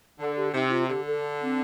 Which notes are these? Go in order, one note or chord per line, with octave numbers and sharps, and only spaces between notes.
D3 A4
G4
C3 D#4
D#4
F4
D3 G4
A4
C4